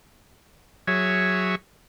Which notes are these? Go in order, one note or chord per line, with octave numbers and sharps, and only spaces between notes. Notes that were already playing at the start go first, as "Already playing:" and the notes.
F#3 G#4 C#5 E5